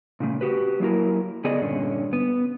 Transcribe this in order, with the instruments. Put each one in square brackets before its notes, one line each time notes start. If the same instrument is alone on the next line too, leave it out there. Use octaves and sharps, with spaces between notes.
[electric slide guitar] A#2 C#3 A3
F#4 G4 B4
F#3 A#3 E4 A#4
C#3 B3 G#4 A4 D5 D#5
G2 A#2 D3 C#4
B3